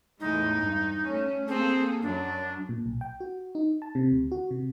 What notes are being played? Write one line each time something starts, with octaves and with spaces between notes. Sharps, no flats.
E2 A2 G#3 D#4
G2
A3 C#4
A#3 C4 G#4 A4
F#2 F#3 D4
A#2
B1
G5
F#4
D#4
A5
C3
D2
F#4
C3